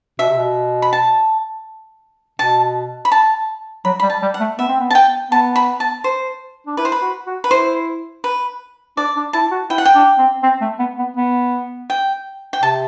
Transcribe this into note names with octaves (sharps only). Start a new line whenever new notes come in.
B2 E5
C3
B2
B5
A5
B2 A5
B5
A5
F#3 B5
G3 B5
A5
G3
F#5
A3
B3 E5
C4
B3
A5
G5
B3 A5
B5
A5
C5
D4
E4 B4
C5
B4
F#4
F#4
B4
E4 C5
B4
D4 D5
D4
E4 A5
F#4
E4 G5
F#5
G5
D4
C4
C4
A3
B3
B3
B3
G5
G5
C3 A5